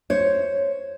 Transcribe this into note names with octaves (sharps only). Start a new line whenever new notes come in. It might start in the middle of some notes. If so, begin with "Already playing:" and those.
C5 C#5